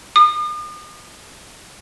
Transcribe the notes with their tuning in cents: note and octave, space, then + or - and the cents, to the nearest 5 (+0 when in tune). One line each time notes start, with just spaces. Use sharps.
D#6 -45